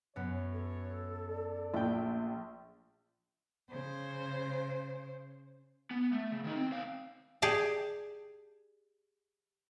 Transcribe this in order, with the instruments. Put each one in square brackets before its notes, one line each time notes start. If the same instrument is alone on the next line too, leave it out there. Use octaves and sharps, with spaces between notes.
[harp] F#2 B3 [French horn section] C#5
[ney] A4
[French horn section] D5
[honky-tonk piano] A#1 [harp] A3 G5
[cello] C#3 C5
[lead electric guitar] B3
A3
C#3
D#3 D#4
C4
C2 F5
[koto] G4 G#4 D5 A5